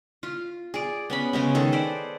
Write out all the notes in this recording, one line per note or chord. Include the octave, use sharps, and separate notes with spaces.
F4
G#4 D5
B3 C#4 B5
C#3 G#3 B3
D#3 G#4 A4
B4 C5 D5